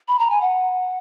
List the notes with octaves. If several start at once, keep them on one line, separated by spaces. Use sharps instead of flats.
B5
A#5
G#5
F#5